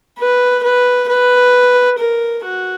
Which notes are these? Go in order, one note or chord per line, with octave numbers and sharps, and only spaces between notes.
B4
B4
B4
A#4
F#4